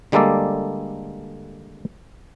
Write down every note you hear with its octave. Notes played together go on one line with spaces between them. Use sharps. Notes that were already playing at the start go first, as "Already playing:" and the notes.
D3 G3 G#3 A#3 A4 D5